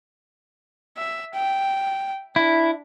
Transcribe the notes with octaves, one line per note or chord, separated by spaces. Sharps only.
E5
G5
D4 E4